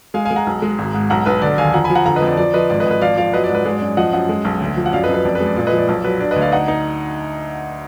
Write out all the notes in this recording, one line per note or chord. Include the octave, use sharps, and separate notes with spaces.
G#3 F5 G#5
F5 G#5
G#3
F#5 A#5
B1
G#3
G#1
G#2
B1 F#5 A#5
B1 B4
D3 D5
D#2 F5 G#5
F3 F#5 A#5
G#5 B5
F3
F#5 A#5
D3 F#5 A#5
B4 D#5
F2
D5
F3 D5
F3 B4 D#5
G#1 D5
B4 D#5
G#1
B4 D#5
F3 D5 F5
F3 D5 F5
F#3 B4 D#5
D5
G#2
B4
G#3 D5
D5
F#2
F3 D#5 F#5
F#2 D#5 F#5
G#3
B1
D2
F3
F#5
F#2 D5 F5
B4 D#5
F#2
B4
F2 D5
B4
G#3
D5
A#2 D5
B4 D#5
F3
D5
B1 D5
F#3 B4
D4 D5
B4 D#5
D2
D5 F5
D#4 D#5 F#5
D#4